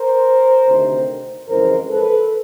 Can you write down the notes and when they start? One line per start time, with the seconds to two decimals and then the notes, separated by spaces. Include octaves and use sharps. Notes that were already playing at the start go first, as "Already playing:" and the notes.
Already playing: A#4 C5
0.66 D2 C3 D#3
1.49 F2 C#3 E3 G#3 A#4 C5
1.89 A4 B4